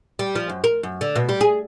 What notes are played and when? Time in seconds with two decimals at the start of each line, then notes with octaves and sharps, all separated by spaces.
0.19 G3
0.35 F3
0.49 F#2
0.64 A#4
0.83 F#2
1.01 D3
1.16 B2
1.29 G3
1.41 G#4